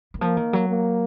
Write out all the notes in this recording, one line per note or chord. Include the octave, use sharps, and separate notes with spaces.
D#3
F3 A#3
D#3
F#3
A#3